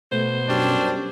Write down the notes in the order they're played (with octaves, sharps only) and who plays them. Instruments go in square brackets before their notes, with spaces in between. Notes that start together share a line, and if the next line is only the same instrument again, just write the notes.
[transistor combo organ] B2 [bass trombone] A3 [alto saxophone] C5
[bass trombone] F#2 [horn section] G3 C#4 D4